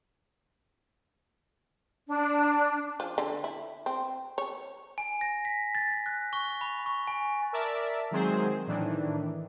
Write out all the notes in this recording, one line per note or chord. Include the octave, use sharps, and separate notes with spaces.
D4
F3
D3
E4
C4
C#5
G#5
A#6
B6
A6
F#6
C#6
B5
C#6
G#5
A#4 D5 E5 A5
D#3 F#3 G#3 C4 G#4 C5
A2 D#3 E3 D4